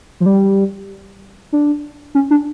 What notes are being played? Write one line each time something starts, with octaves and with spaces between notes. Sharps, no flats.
F3
G3
D4
C#4
D4